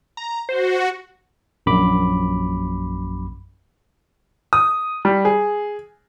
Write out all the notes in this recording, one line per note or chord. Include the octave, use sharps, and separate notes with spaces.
A#5
F#4 C5
A#1 F#2 B5 D6
D#6
G3
G#4